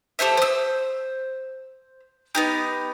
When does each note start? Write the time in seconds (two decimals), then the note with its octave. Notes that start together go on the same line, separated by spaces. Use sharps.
0.19 G4 A4 C5 E5
0.37 C5 E6
2.35 B3 D#4 G4